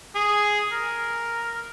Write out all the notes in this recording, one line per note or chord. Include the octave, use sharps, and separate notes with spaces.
G#4
A#4